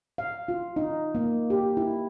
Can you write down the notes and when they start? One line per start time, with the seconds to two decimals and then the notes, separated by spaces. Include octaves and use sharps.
0.18 F5
0.48 F4
0.76 D#4
1.15 A#3
1.50 G4
1.77 E4